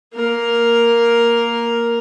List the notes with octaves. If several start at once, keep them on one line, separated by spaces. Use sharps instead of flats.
A#3 A#4